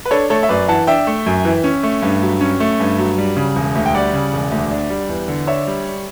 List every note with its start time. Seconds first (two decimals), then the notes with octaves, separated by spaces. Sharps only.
0.06 B4
0.11 D4 A4 C#5
0.30 A3 A4 C#5
0.43 E5
0.49 F#2 B4 D5
0.68 E3 F#5 A5
0.87 D4 E5 G5
1.07 A3
1.26 F#2
1.45 E3
1.64 C#4
1.83 A3
2.02 G2
2.22 F#3
2.41 C#4
2.60 A3
2.80 G2
2.98 F#3
3.18 G3
3.36 C#3
3.56 E1
3.75 D2
3.86 G5
3.94 G3 D5 F#5
4.13 C#3
4.33 E1
4.52 D2
4.71 D4
4.90 G3
5.09 E2
5.28 D3
5.47 D4 C#5 E5
5.67 G3